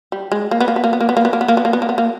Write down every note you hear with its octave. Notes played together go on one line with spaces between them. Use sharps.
G3
G#3
A#3
B3
A#3
B3
A#3
B3
A#3
B3
A#3
B3
A#3
B3
A#3
B3
A#3
B3
A#3
B3
A#3